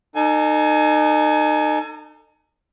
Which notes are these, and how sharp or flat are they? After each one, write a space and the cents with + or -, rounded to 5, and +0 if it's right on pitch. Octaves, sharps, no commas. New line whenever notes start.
D#4 -30 A4 +25 G#5 +25